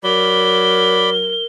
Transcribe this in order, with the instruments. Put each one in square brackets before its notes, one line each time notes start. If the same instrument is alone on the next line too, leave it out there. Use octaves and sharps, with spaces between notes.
[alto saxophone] F#3 [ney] A#4 [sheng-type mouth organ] D5 B5 [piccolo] G7